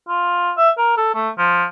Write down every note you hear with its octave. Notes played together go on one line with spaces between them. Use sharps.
F4
E5
A#4
A4
A3
F3